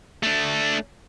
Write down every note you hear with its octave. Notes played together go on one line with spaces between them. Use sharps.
A3 D4